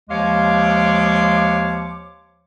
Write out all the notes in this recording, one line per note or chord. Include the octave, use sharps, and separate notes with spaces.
D#2 F3 G#3 C#5 F5 D6